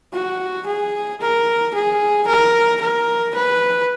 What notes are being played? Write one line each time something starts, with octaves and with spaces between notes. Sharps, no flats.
F#4
G#4
A#4
G#4
A#4
A#4
B4